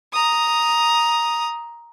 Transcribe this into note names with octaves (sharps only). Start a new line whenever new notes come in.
A#5 D#6